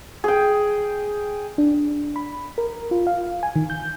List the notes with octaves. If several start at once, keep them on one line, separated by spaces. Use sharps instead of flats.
G#4 G5
D4
B5
A#4
F4
F5
G#5
D#3
G6